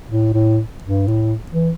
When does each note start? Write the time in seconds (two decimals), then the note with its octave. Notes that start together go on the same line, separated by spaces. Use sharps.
0.09 A2
0.34 A2
0.84 G2
1.08 A2
1.51 E3